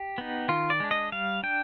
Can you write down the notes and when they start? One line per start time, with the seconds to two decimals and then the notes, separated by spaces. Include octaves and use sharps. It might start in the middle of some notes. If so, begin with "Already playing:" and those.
Already playing: G4
0.18 B3 D#4
0.48 D#3 F4
0.70 D5
0.80 G#3 D4
0.91 D#5
1.12 G3 F5
1.43 D4 G5